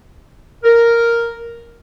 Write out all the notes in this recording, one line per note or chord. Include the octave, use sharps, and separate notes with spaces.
A#4